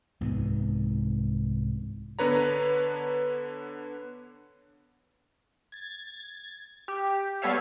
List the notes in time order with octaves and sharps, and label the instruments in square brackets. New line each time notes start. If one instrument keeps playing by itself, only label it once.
[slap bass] C2 G#2 E3 B3
[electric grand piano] D3 B3 D4 B4 C#5 A#5
[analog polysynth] G#6 A6
G4
G3 B3 A4 C#5 E5 F5